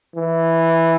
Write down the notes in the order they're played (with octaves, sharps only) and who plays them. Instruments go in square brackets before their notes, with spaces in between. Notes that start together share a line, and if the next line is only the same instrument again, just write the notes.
[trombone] E3